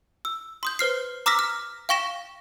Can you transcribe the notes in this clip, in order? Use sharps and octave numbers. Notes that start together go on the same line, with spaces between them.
E6
C6 D#6 G6
B4 C5 F6 C7
A#5 D6 E6 F6 A#6 B6
F6
F5 G5 C#6 A#6 E7